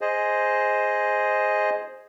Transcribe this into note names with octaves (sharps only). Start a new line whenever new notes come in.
G#4 C5 D#5